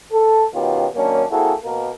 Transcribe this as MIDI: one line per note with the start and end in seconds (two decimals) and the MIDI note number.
0.11 0.44 69
0.53 0.86 47
0.53 0.86 51
0.53 0.86 59
0.53 0.86 61
0.53 0.86 65
0.53 0.86 67
0.95 1.24 51
0.95 1.24 54
0.95 1.24 58
0.95 1.24 61
0.95 1.24 62
1.30 1.53 58
1.30 1.53 60
1.30 1.53 64
1.30 1.53 66
1.30 1.53 68
1.30 1.53 69
1.63 1.90 47
1.63 1.90 58
1.63 1.90 70